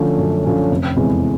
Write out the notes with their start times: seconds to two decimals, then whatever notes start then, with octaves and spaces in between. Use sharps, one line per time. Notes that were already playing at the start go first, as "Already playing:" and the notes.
Already playing: D3 F3 A3 C#4
0.18 F#2
0.44 D3 F3 A3 C#4
0.71 F1
0.97 E2 C3 E3 G#3